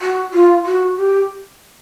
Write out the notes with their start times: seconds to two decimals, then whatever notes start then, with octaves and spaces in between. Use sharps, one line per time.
0.01 F#4
0.33 F4
0.65 F#4
0.97 G4